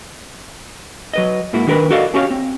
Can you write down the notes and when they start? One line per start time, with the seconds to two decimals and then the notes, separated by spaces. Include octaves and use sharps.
1.14 F#3 B4 D#5
1.53 G#2 A#3 E4 F#4
1.67 D#3 D4 G4 A#4 B4 B5
1.91 F#4 A4 D5 D#5 F5 F#5
2.14 C#4 F#4 G4 C#5 D5 F5
2.30 C4